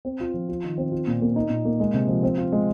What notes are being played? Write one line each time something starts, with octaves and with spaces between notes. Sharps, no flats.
C4
F4
F3
F4
D#3
C4
F4
A#2
A#3
D#4
A#2
A#3
G#3
C3
F3
C4
F4
G#3